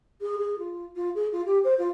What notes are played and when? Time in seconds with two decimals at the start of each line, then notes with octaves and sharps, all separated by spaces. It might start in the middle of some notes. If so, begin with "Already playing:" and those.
0.21 G#4
0.38 G#4
0.58 F4
0.96 F4
1.15 G#4
1.32 F4
1.46 G4
1.64 C5
1.78 F4